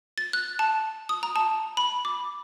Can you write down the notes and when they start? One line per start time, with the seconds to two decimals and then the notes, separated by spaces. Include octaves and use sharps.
0.18 A6
0.33 F#6
0.59 A5
1.09 D#6
1.23 A#5
1.36 A5
1.77 B5
2.05 D6